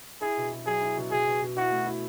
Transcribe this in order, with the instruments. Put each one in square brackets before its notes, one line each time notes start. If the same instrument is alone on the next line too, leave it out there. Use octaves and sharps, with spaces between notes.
[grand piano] E4 [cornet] G#4
[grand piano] B2
B2
[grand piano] F#3 [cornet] G#4
[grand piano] E4
B2
[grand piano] B2 [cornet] G#4
[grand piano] B2
B2
[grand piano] E4 [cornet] F#4
[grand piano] A3
E4